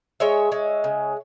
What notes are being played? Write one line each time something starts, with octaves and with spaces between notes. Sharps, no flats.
G#3 C#5 E5
G#3
C#3